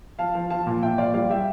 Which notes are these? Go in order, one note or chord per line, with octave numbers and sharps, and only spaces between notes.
F3 F5 A5
F3
F3 F5 A5
A#2
A#2 E5 G5
A#2 D5 F5
G3 D5 F5
G3 E5 G5